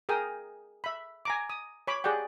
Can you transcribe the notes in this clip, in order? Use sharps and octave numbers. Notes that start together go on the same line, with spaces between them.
G#4 A#4 G5 D#6
E5 B5
G#5 A#5 D6
D#6
C#5 B5 D6
G4 G#4 D5 F#5 G5